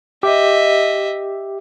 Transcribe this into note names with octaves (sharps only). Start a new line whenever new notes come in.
G4 D#5 E5